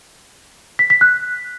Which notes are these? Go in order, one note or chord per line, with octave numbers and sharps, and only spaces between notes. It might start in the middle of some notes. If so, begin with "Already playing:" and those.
B6
B6
F#6